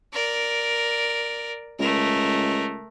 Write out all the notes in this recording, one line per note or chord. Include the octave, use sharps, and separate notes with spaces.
A#4 D5
C#2 A3 A#4